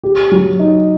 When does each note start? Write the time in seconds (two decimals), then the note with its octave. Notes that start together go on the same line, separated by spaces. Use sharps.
0.03 G4
0.32 F#3
0.59 D#4